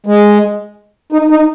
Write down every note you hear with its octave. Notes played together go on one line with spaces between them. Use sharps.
G#3
D#4
D#4